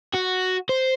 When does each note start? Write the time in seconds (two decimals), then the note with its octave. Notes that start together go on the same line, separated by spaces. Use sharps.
0.14 F#4
0.69 C5